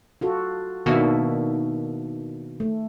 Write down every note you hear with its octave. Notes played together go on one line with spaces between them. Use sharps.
F4 F#4 A4
B2 D#3 A#3 D4 F#4 E5
A3